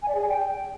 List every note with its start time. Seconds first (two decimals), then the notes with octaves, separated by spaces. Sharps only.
0.02 G#5
0.09 D5
0.15 G#4
0.22 G#5
0.28 G5